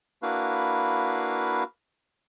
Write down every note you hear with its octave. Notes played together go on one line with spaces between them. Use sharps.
A#3 D4 E4 F#4 B4 F5